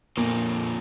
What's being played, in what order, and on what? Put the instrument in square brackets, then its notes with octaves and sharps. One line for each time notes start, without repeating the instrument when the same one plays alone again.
[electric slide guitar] F2 D3 F3 A#3 [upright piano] A#2